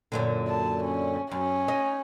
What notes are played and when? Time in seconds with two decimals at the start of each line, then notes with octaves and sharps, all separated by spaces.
0.12 F#2 A#2 D3
0.48 A5
0.84 C#4
1.31 F#2 C#4
1.68 D#4 D#5